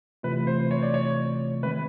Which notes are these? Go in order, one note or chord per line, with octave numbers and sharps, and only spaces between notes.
C3 E3 A3 C4 F4 B4
C5
C#5
D5
C#5
D#3 G#3 C4 B4